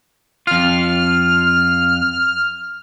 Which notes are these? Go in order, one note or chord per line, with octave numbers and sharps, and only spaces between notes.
F2 F4 F6